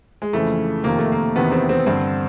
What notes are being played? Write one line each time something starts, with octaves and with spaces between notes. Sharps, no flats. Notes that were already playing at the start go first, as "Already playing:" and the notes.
G#3
F2 C#3 E3 A3
F2 C3 D#3 A#3
A3
A#3
E2 C3 D#3 B3
C4
C4
G2 D3 C4